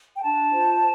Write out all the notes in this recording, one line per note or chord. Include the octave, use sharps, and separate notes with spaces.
G5
D4 A5
F4 C5